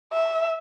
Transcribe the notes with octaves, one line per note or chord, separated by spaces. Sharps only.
E5